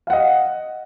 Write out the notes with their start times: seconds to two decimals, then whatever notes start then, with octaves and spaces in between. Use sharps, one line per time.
0.07 F5
0.10 F#5
0.13 D#5